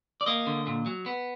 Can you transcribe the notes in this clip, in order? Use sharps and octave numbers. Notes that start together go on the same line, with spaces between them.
D5
A#3 D#5
D3
A#2
F#3
B3